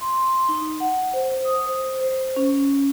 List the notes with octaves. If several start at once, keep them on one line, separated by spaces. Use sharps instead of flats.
C6
D#4
F#5
C5
D#6
C5
C5
C#4